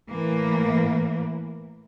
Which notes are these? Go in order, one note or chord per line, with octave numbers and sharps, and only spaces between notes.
A2 E3 A#3